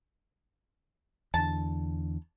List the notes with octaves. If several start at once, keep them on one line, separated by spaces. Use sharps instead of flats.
E2 D3 A5